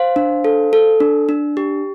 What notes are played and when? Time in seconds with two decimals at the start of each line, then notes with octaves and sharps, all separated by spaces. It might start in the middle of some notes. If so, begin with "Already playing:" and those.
Already playing: C5 F5
0.16 D4
0.44 A4
0.73 A4
1.00 D4
1.29 D4
1.57 G4